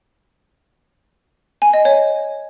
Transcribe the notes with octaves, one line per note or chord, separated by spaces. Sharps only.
G#5
D#5
C#5